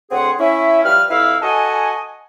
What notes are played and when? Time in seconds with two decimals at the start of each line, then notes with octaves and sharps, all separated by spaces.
0.11 D2 C4 G#4 C#5 F#5 C6
0.40 C#4 E4 E5
0.85 F3 G3 B4 F6
1.10 F2 E4 B4 F5 E6 F6
1.42 F#4 A4 D#5 F#5 G#5